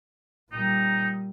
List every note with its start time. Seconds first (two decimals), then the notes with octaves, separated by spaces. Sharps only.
0.52 A#2 G3 D#4